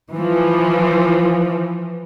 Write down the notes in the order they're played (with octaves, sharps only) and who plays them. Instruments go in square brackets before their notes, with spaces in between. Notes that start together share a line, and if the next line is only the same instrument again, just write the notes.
[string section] E3 F3